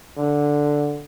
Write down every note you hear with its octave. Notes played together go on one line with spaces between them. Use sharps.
D3